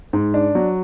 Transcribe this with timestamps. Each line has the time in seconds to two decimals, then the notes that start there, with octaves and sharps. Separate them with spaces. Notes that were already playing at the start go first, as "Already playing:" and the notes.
0.13 G#2
0.34 D4
0.55 F#3